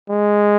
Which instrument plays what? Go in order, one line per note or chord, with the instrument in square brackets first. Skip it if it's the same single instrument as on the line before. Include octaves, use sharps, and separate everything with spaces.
[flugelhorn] G#3